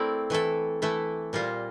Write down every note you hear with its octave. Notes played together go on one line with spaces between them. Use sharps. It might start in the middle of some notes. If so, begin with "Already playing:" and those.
Already playing: A3 C4 E4 A#4 D5
E3 A3 E4 A4
E3 A3 E4 A4
A#2 G3 A#3 F4 C5